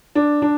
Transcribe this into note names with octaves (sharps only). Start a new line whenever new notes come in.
D4
D4